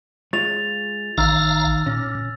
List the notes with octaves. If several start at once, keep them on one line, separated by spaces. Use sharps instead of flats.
G#3 F4 C#5 A6 F7
A1 D#3 F5 A#5 E6 F6 A6
A#2 C#4